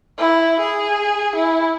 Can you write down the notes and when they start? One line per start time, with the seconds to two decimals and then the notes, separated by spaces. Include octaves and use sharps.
0.18 E4
0.60 G#4
1.36 E4